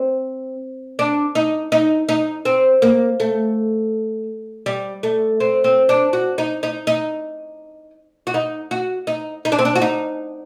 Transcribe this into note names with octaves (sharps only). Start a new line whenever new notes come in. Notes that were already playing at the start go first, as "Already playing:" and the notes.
Already playing: C4
D4
D#4
D#4
D#4
C4
A#3
A3
G3
A3
C4
C4
D4
F#4
D#4
D#4
D#4
F#4
D#4
F#4
D#4
D#4
D4
C4
D4
F#4
D#4